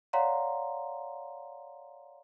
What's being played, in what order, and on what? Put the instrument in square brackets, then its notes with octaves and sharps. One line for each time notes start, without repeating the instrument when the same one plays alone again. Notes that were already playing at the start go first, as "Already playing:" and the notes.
[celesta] C#5 D5 F5 F#5 A#5 C6